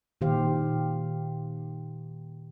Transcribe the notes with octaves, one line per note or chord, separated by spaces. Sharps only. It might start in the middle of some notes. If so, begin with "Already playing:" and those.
A#2 D#3 G4 C5 F5